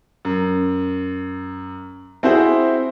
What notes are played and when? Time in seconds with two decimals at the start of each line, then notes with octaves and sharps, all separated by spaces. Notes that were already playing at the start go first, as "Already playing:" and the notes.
0.25 F#2
2.23 C4 E4 F#4 G#4 C5